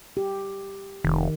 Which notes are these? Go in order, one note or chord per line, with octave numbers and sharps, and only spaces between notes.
G4
F1 D#3